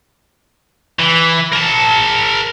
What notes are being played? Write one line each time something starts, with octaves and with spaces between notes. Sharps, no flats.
E3
A#4 A5